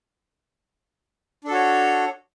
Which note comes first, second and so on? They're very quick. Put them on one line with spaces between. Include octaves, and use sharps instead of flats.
D4 A4 F#4 C#5